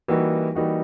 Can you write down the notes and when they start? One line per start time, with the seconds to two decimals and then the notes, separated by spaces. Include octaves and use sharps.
0.08 E3 G3 A#3 D#4 F#4
0.55 E3 G3 A#3 D#4 F#4